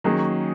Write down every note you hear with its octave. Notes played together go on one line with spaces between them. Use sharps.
D#3 F#3 A#3 C#4 G#4